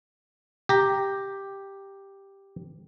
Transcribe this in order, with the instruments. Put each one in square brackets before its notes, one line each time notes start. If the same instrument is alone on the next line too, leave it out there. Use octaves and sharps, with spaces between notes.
[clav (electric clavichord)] G4 A#5